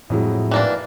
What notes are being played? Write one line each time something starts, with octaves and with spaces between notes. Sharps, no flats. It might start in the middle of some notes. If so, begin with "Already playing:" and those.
F2 A2 F#3 G#3 E4
E3 A#3 D4